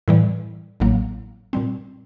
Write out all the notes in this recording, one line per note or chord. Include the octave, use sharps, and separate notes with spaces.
A2 E3 G3
A1 A2 F#3 A#3
A#2 G3 C4